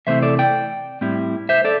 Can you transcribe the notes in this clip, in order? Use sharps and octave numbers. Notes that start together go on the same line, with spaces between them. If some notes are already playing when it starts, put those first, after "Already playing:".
C3 E3 A3 C4 E4 C5 E5
A4 D5
D5 G5
A2 G3 C4 E4
C5 E5
A4 D5